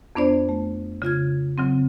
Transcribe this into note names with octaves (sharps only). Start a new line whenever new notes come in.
F2 B3 D4 C5 D5
A3
C#3 F4 F6 G#6
C#3 F#3 C4